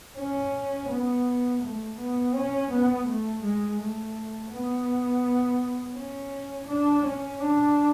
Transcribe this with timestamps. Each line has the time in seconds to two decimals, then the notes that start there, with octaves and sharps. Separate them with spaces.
0.18 C#4
0.89 B3
1.62 A3
1.98 B3
2.34 C#4
2.70 B3
3.07 A3
3.43 G#3
3.79 A3
4.51 B3
5.96 C#4
6.68 D4
7.05 C#4
7.40 D4